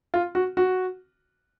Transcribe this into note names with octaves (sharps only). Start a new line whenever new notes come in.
F4
F#4
F#4